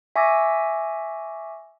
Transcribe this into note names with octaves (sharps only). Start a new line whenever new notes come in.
E5 G#5 C#6 D6 E6 A#6